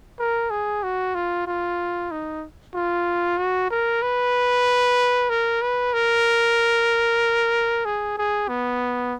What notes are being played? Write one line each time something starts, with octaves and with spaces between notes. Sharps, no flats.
A#4
G#4
F#4
F4
F4
D#4
F4
F#4
A#4
B4
A#4
B4
A#4
G#4
G#4
B3